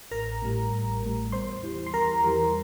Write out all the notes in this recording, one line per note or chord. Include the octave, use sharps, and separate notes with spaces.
A1 A#4 A#5
A2 G3
A1
A2 G3
E2 C5 C6
E3 G3
C6
E2 A#4 A#5
E3 G3